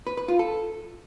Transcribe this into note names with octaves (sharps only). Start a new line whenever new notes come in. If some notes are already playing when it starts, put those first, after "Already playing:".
B4
B4
F4
A4